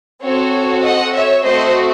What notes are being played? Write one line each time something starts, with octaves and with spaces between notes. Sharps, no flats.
C4 F#4 A4 C#5
D#5 F#5
C#5 E5
A3 C4 F#4 C5 D#5